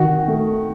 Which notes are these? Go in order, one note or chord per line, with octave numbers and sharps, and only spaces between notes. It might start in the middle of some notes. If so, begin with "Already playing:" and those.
Already playing: D#3 F#4
A3